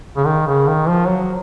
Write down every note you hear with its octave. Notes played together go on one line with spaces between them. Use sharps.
C#3
D#3
C#3
D#3
F3
F#3